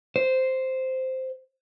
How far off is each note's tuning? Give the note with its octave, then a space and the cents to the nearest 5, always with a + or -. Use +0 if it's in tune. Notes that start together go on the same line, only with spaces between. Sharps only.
C5 -5